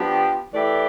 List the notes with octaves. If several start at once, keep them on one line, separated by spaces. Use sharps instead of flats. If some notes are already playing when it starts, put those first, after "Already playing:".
Already playing: F3 B3 D4 G4
E3 A3 E4 G4 D5